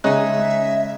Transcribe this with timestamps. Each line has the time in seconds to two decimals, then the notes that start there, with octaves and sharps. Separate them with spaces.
0.04 C#3 G#3 D#4 C#5 E5 G#5 F#6